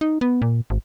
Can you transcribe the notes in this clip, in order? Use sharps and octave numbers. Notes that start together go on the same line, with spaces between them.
D#4
B3
A#2
G#1